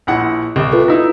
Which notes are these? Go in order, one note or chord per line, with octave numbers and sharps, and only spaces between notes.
A#1 E4 F#5
C2
F4 A4 B4
D#4 E4